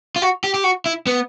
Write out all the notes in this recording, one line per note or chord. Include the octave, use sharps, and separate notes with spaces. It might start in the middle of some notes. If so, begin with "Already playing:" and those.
F4
F#4
G4
G4
F#4
E4
B3